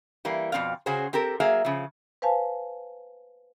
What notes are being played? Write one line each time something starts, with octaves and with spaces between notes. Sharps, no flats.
E3 G3 A#3
F2 B2 C4 D5 F5
C#3 C#4 F#4 G#4 C5
C4 G4 A4 A#4
F#3 A#3 G#4 E5 F5
C#3 F3
B4 C5 F5 G#5 A5